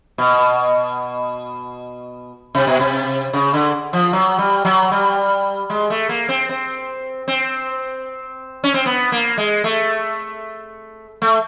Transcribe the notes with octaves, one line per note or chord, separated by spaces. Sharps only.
B2
C3
B2
C3
C#3
D3
F3
F#3
G3
F#3
G3
G#3
A3
A#3
C4
C4
C4
C#4
C4
B3
A#3
G#3
A3
A3